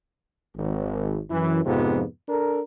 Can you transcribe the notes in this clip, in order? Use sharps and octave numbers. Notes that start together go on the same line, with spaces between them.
G#1
F#2 E3
F2 G#2 C3 F3 B3
D4 A4 A#4